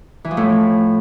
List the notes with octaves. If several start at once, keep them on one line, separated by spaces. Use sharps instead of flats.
E3
F3
A2